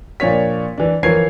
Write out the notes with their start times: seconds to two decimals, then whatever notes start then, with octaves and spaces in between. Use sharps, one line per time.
0.20 A#2 F3 D4 C#5 B6
0.78 E3 D4
1.03 E3 F3 A#4 C#5 G#6 C7